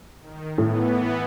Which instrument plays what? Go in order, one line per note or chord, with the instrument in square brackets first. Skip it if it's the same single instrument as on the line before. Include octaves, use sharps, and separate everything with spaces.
[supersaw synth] D#3
[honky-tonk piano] A2 [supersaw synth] E3 B3